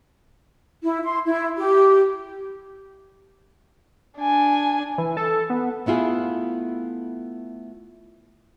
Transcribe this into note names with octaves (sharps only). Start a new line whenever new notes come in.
E4
C6
E4
G4
D4 G#5
E3
A4
B3
A3 B3 E4 F4 G#4